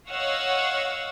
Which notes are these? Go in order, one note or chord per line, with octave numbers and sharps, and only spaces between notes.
C#5 D#5 F5 F#5 C#6 E6